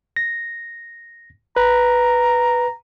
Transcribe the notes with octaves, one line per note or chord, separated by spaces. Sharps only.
A#6
B4 A#5